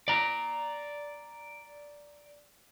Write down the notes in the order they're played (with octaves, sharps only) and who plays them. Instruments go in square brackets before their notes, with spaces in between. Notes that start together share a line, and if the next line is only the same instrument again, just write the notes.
[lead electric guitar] D5 A#5